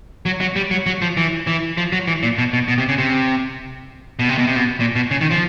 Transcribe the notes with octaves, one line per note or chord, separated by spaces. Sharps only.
F#3
F#3
G3
F#3
F#3
F3
E3
E3
F3
F#3
E3
A#2
B2
B2
B2
C3
C#3
C3
B2
C3
B2
C3
B2
A#2
B2
C#3
D#3
F3